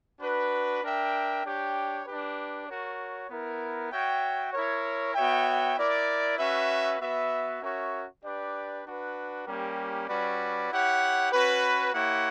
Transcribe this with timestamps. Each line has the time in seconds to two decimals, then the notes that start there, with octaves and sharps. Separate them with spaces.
0.21 D4 F#4 B4
0.83 D4 A#4 E5 G5
1.44 D4 G4 C#5 G5
2.06 D4 G4 B4
2.68 F#4 A#4 C#5
3.30 B3 E4 A#4
3.92 F#4 C#5 E5 G5
4.53 E4 A#4 C#5
5.15 B3 F#4 C#5 E5 G5
5.76 E4 A#4 D5
6.38 C#4 F#4 B4 E5
7.00 B3 F#4 B4 E5
7.62 C#4 F#4 A#4 C#5 E5
8.24 D4 G4 B4 D5
8.86 D4 F#4 B4
9.47 G3 A#3 C#4 G4 A#4
10.09 G3 C#4 F#4 B4 D5
10.71 E4 G4 C#5 F#5
11.33 C#4 F#4 B4
11.94 A#3 E4 G4 C#5 F#5